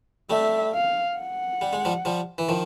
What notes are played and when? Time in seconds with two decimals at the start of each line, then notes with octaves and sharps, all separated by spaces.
0.30 G3 A3 E5
0.73 F5
1.18 F#5
1.61 G3
1.73 G#3
1.85 F3 G3
2.05 F3 G3
2.38 E3
2.49 D#3 F3